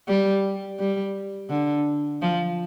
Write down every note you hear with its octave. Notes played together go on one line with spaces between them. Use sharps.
G3
G3
D3
F3